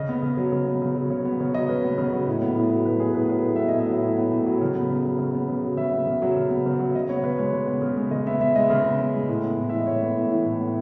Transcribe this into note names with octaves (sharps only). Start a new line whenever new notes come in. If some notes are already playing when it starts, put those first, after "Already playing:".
Already playing: C#3 D#5
B3
C#3
F#3
C#3
B3
C#3
F#3
C#3 C#5
B3
C#3 C#5
F#3 D#5
C#3 B4
B3
C#3
F#3
A2
B3
A2
F#3
A2 B4
B3 G#4
A2 B4
F#3 B4
A2
B3 E5
D#5
A2
E5
F#3
A2
B3
A2
F#3
C#3
B3
C#3
F#3
C#3
B3
C#3
F#3
C#3 E5
B3
C#3
F#3
C#3
B3
C#3
F#3
C#3 D#5
B3 C#5
C#3 B4
G#3 C#5
C#3
B3
C#3
G#3
C#3 D#5
B3 E5
C#3 E5
G#3 D#5
C#3
B3
C#3
G#3
A2
B3
A2
E3 E5
D#5
A2 C#5
B3
A2
E3
A2
B3